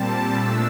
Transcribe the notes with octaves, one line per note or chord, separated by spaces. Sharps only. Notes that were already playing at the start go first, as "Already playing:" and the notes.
Already playing: A#2 G3 C4 A5
A#2 A3 D4 E6